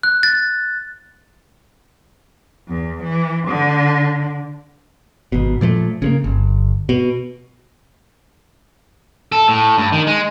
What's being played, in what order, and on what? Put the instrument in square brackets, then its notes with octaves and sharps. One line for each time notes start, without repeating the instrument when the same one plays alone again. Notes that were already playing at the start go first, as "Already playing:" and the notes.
[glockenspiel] F#6
A6
[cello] E2
E3
D3
[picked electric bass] G#1 B2
A#2 F3 G#3 A3
C#3 G#3 A#3
G1
B2
[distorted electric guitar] A4
A2
G2
D#3
G#3